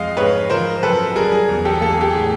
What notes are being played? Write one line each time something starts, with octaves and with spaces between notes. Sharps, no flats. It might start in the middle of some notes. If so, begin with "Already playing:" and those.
Already playing: F2 G#3 D#5 F5
G#2 B4 C#5
F3 A#4 C5
F#2 A4 B4
G3 G#4 A#4
G#4
E2
G4 A4
A#3 A4
G#4
G4
A2 G#4